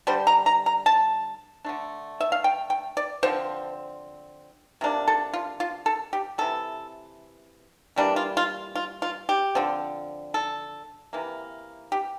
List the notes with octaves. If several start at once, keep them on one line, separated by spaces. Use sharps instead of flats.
D3 G3 D4 C5
A#5
A#5
A#5
A5
D3 A3 D4
E5
F5
G5
G5
D5
D3 F3 C4 C5
C3 F3 A#3 D4
A4
F4
F4
A4
G4
C3 E3 G3 A4
E3 G3 A#3 D4
F4
F4
F4
F4
G4
D3 F3 C4
A4
C3 E3 A#3
G4